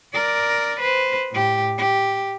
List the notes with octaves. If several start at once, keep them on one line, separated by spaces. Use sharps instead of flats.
A#4 D5
B4 C5
A2 G4
G4